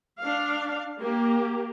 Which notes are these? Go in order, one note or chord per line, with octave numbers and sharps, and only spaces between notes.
D4 F5
A#3 G4